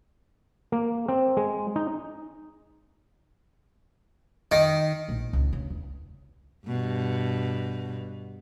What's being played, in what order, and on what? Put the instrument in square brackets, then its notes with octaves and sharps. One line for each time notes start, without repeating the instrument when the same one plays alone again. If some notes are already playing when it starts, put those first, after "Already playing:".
[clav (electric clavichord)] A#3
C4
G#3
D#4
[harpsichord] D#3
[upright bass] A#1
C#2
C#3
E2
[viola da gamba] G2 B2